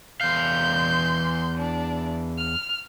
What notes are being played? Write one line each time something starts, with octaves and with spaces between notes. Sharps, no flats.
E2 F5 C6 G6
D4
F6